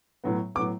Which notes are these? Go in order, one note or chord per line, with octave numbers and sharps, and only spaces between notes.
A2 F#3 B3
A2 F#3 B3 D6